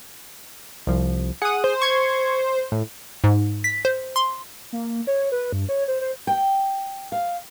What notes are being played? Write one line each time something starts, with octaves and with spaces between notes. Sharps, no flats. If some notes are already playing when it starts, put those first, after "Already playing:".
C2 F3
G#4 F#5 D#6
C5
C#6 G#6
A2
G#2
B6
C5
C6
A#3
C#5
B4
G2
C#5
C5
C5
G5
F5